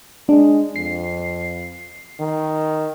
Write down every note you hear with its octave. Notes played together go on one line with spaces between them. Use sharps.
G#3 D4
F2 C7
D#3